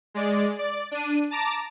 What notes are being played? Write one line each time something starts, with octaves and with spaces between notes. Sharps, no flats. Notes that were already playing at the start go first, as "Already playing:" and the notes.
G#3 D5
D5
D4 D#7
A5 A#5 D6